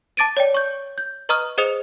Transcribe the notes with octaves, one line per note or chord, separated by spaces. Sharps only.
A5 D6 A6 D7 D#7
C#5 D5 G5
C#6 G6
G6
B4 D#5 A#5 C#6 D#6 F6
G#4 C5 D#5 D#6 C#7 F7